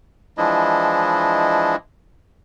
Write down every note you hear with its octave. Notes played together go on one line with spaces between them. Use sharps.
E3 F3 G#3 D4 E4 D#5